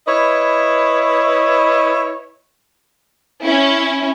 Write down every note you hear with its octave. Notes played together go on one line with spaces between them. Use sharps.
E4 B4 C#5 D#5
C#4 E4